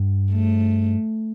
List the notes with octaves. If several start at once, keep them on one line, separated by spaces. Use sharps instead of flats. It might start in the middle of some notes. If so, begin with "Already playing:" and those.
Already playing: G2
A3